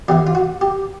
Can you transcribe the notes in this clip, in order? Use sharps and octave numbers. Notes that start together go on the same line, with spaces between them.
E2 C#3 E3 G4
F4
F#4
G4